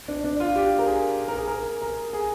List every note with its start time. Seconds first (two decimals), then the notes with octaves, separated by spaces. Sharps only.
0.08 D4
0.24 D4
0.40 F4
0.56 G4
0.79 A#4
0.86 G#4
1.28 A#4
1.38 G#4
1.48 A#4
1.82 A#4
2.13 G#4